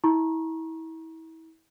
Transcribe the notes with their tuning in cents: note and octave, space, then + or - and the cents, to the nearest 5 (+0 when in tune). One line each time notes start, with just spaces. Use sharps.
E4 -30 A#5 +25 C#6 -25